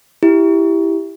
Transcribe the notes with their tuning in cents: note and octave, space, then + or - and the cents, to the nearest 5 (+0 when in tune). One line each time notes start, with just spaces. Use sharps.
E4 +0 G4 +5